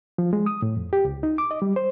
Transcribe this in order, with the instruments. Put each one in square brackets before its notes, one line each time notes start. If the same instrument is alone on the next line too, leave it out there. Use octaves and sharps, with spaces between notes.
[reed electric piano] F3
G#3
D#6
A2
F2
G4
C#2
D#4
D6
D#5
G3
C5